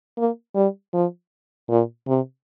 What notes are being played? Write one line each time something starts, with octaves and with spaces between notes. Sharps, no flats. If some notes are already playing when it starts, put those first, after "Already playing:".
A#3
G3
F3
A#2
C3